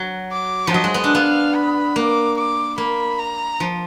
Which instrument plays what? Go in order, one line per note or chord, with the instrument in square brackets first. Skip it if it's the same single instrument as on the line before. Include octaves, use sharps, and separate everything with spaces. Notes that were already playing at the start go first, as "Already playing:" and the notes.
Already playing: [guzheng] F#3
[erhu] D6
[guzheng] F3
[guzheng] F#3 [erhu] D#5
[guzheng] G#3
B3
D4
[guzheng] B3 [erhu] F5
[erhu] B5
[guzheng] A#3 [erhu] D6
[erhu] D6
[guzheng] A#3 [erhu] B5
[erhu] A#5
[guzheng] F3